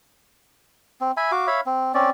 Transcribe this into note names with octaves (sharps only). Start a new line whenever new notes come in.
C4
E5 G#5 B5
F#4 F5 D6
C#5 E5 F5 B5
C4
C4 C#4 D5